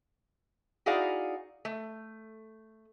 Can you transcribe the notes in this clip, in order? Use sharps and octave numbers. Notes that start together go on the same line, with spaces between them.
D#4 E4 F#4 G#4 D5 F5
A3